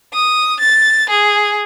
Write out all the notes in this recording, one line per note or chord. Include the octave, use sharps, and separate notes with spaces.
D#6
A6
G#4